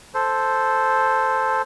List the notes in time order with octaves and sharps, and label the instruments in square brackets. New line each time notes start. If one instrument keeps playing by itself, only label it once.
[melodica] A4 C5